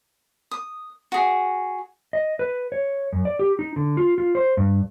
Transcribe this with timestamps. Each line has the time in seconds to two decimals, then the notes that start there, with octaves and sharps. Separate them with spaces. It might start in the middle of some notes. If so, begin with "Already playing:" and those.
0.51 D#6
1.12 F#4 G#4
2.13 D#5
2.39 B4
2.72 C#5
3.13 F#2
3.25 D5
3.39 G4
3.59 D#4
3.76 D3
3.97 F4
4.18 F4
4.35 C5
4.57 G2